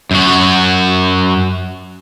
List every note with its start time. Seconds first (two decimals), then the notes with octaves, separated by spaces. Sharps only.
0.11 F#2 F#4